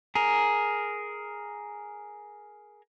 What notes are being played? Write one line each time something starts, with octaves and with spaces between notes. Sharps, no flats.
G#4 A#4